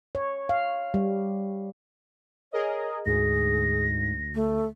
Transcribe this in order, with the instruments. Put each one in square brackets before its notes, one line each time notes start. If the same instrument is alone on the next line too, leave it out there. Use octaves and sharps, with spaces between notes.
[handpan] C#5
F5
G3
[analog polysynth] G#4 A#4 D#5 [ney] C#5
[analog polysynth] D2 [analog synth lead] G#2 [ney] G#4 [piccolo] A#6
[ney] A3